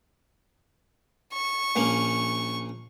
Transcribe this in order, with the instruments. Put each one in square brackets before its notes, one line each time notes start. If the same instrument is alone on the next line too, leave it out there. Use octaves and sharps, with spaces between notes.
[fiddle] C#6
[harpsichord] A#1 A#3 C#4